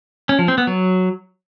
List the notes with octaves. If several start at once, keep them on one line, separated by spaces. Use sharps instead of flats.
C#4
F3
C4
B3
F#3